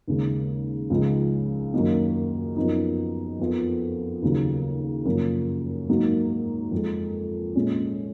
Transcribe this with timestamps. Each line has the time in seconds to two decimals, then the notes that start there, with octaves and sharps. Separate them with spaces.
0.08 D#2 C#3 G#3
0.90 C#2 C#3 F3 G#3 D#4
1.73 F#2 D#3 F#3 A#3 D#4
2.56 F#2 F3 B3 D#4
3.39 F2 F3 B3 F4
4.22 D#2 C#3 F#3
5.05 F#2 C#3 F3 A#3
5.89 G#2 F#3 A#3 D#4
6.71 F2 F3 G#3
7.56 A#2 G#3 C#4